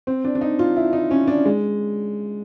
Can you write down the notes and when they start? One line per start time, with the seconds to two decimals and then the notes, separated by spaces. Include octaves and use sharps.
0.07 C4
0.24 D4
0.35 D4
0.41 D#4
0.59 F4
0.76 E4
0.93 D#4
1.11 C#4
1.28 D4
1.45 G#3